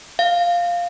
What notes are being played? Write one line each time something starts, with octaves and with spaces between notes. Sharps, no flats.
F5